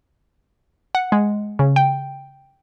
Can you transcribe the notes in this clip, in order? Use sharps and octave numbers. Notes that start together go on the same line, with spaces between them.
F#5
G#3
C#3
G5